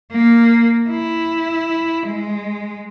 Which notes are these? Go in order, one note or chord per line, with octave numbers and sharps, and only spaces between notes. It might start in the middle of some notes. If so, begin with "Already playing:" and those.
A#3
E4
G#3